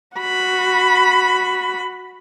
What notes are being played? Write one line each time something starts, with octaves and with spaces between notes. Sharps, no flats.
F#4 B5